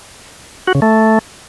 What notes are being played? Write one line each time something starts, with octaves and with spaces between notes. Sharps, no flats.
F#4
C#3
A3